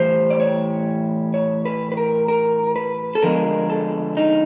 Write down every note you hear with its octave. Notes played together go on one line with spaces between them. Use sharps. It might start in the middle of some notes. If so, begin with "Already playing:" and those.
Already playing: A2 E3 G3 C5
D5
C#5
C#5
B4
B4
A#4
A#4
B4
A4
D3 F3 G#3 B3 A#4
A4
D#4